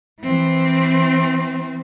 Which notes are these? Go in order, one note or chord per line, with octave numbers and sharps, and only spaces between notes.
E3 C4